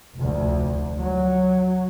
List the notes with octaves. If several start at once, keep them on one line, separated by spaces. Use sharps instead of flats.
F1 D2
F#3